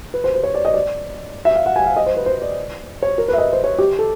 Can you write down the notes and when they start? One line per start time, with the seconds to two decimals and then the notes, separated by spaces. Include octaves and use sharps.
0.14 B4
0.24 C5
0.34 C5
0.44 C#5
0.55 D5
0.65 D#5
0.74 D5
1.45 E5
1.56 F5
1.66 F#5
1.76 G#5
1.86 F5
1.96 D#5
2.06 C5
2.17 B4
2.26 C5
2.42 D5
3.03 C#5
3.18 A#4
3.28 B4
3.33 E5
3.38 D#5
3.53 C5
3.64 C#5
3.79 G4
3.99 A4